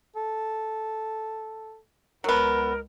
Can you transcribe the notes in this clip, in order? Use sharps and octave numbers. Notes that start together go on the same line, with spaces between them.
A4
C#2 F#3 B3 A#4